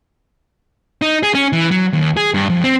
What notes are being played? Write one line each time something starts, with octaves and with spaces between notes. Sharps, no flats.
D#4
G#4
C#4
E3
F#3
D#2
G#4
G2
F2
C4